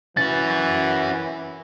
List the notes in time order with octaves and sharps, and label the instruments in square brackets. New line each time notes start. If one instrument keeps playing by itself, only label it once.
[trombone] E3 [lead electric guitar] C#4 F#4 [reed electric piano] A6